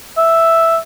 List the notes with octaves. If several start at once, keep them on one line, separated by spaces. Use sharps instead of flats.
E5